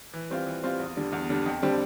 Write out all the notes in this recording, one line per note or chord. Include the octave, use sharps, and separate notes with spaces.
E3
G3 C4 F4
E3
G3 C4 F4
E2
D3 G3
E2
D3 G3
F2
D3 G3 C4